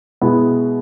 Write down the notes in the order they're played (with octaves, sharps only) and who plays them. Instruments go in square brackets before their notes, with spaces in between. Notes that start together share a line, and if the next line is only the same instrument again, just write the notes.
[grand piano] B2 G#3 B3 E4